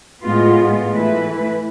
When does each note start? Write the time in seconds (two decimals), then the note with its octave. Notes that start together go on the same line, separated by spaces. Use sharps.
0.23 A2 G#3 B3 F4
0.91 E3 A3 E4 B4